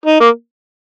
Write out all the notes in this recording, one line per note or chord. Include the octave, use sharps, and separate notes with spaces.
D#4
A#3